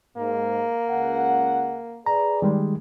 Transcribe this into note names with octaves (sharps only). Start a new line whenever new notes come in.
G#2 A#3
C#2 F#5
G#4 B4 D5 A#5
D#3 G3 G#3